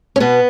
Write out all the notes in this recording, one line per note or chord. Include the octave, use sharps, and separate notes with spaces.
C#4
B2 B3